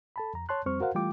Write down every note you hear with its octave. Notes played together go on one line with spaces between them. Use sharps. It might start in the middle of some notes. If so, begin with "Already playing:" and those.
A4 A5 B5
F2 A#5
C#5 A5 C6 F#6
F2 G3 C4 C5 C#6 F6
F#4 A#4 C5 F5 F#5
E3 G3 A3 F4 G5 D6